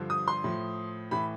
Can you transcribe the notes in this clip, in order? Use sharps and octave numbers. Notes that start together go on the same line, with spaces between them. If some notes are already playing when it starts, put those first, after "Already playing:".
Already playing: G2 D3 F3
D#6
C6
A2 F3
A2 E3 B5